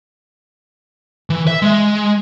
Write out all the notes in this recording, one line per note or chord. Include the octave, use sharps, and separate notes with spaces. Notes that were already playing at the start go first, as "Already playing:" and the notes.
E3
E5
G#3